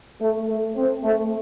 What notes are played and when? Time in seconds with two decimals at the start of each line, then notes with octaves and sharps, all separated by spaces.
0.20 A3
0.48 A3
0.77 C4
1.04 A3